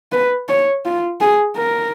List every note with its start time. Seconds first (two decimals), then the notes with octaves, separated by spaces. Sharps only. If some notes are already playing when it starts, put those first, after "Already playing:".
0.12 B4
0.48 C#5
0.85 F4
1.21 G#4
1.57 A#4